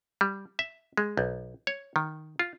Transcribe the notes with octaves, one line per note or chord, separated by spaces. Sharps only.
G3
E5
G#3
B1
C#5
D#3
F4